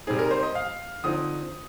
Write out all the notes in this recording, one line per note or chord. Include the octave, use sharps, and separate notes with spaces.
C3 G3 C4 D#4 G#4
A#4
C5
D#5
F5
D3 F3 C4 D#4 D#6